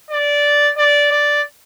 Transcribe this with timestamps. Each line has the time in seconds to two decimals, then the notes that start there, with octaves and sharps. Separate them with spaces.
0.10 D5
0.77 D5
1.11 D5